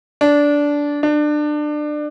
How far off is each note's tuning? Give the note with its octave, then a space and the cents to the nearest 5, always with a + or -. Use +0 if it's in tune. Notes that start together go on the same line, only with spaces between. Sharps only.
D4 -15
D4 +25